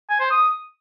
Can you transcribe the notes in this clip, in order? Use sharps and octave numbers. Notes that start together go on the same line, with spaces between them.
G#5
C5
D#6